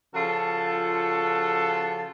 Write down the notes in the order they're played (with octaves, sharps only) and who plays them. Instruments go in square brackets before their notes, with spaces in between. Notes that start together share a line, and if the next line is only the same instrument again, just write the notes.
[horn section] C#3 F3 F4 F#4 A4